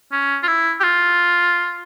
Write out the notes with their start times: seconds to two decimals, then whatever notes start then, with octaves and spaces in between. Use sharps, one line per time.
0.12 C#4
0.43 F4
0.48 E4
0.80 G4
0.84 F4